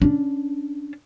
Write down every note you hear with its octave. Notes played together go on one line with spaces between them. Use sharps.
C#4 D4